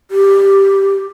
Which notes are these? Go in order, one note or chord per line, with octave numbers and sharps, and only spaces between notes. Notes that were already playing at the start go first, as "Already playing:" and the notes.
G4